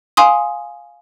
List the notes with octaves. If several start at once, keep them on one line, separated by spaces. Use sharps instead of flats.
F5 G#5 C6 D#6